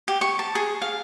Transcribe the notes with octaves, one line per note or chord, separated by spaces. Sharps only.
G4
C#6
A5
G#4
F5